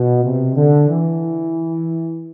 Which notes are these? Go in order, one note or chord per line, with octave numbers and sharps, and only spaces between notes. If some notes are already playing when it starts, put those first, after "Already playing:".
Already playing: B2
C3
D3
E3